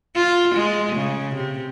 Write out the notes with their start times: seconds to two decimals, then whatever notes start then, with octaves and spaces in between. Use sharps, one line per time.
0.16 F4
0.55 G#3
0.96 C#3
1.35 C3